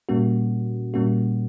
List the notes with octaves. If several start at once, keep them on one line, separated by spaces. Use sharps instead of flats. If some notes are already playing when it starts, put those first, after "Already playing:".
A#2 G3 A#3 C#4 F#4
A#2 G3 A#3 C#4 F#4